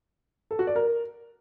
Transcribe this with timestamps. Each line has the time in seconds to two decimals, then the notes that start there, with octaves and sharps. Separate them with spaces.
0.51 A4
0.59 F#4
0.67 D5
0.76 A#4